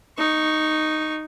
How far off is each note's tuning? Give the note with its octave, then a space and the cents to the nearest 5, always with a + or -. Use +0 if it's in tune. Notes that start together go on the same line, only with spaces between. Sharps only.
D#4 -5 C#6 +5